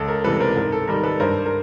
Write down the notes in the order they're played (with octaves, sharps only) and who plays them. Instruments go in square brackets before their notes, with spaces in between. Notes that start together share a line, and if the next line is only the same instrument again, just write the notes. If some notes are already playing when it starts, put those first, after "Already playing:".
Already playing: [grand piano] C#2 A4
A#4
C3 E3 G3 A4 B4
A#4 C5
G#2 A#4
A4
D#3 G3 A#4
A4 B4
G2 A#4 C5
A#4